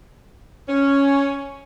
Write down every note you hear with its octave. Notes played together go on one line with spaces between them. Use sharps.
C#4